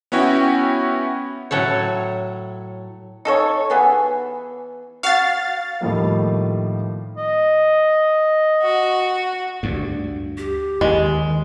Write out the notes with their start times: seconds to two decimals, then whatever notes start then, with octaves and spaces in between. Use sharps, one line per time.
0.12 B3 C#4 E4 F#4 G5
1.51 A2 F#3 A4 C#5
3.25 D#4 A4 C#5
3.70 E3 B3 G#4
5.03 F#4 F5 A6
5.81 A2 D#3 F3 G3 A#3
7.17 D#5
8.62 F#4
9.63 D2 G2
10.38 G4
10.81 D#2 D#3 G#3